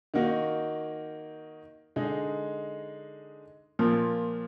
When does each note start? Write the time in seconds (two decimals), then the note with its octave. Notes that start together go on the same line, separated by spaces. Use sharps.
0.14 D#3 A#3 D#4 F#4
1.96 D3 G#3 D#4
3.79 A#2 F3 A#3